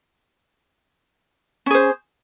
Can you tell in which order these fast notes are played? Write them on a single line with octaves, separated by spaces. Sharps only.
C#4 G#4 C5